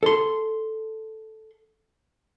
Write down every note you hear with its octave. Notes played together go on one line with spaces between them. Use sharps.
A4 C6